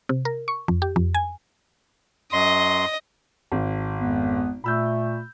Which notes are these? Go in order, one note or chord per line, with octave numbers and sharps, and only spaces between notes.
C3
A#4
C#6
F2
G4
F2
G#5
F#2 D#5 C6
G#1
F2 G#3 B3
A#2 A3 B5 E6 G6